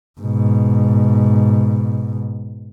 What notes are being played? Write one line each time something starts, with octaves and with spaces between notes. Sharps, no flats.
G#2 B2